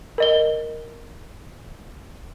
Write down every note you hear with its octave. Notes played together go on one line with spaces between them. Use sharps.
A#4 D#5 G7